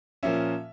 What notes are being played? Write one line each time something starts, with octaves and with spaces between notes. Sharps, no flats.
A#2 F3 A#3 C#4 E5